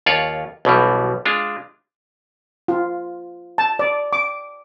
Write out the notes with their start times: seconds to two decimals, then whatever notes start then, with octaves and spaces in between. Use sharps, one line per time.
0.06 D#2 F4 C#5 D5
0.65 B1 B2 E3 G3
1.25 G#3 D4 F4
2.68 F4
3.58 A5
3.79 D5
4.13 D6